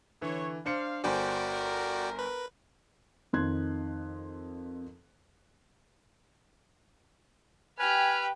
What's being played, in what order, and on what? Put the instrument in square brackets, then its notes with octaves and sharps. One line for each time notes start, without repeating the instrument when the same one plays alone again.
[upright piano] D3 E3 [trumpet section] C#5
[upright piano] D4 C5 C#7 [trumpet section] F5
[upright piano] G1 C5 G#5 [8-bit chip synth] F#4 D5 G5 [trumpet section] A#4
[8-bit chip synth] B4
[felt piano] F2 D#3 C6 F#6 G#6
[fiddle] G4 G5 [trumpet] B4 [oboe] G#5 [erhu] F6